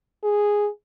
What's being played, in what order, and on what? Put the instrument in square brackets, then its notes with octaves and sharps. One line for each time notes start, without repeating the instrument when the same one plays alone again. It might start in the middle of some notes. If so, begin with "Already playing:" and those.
[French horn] G#4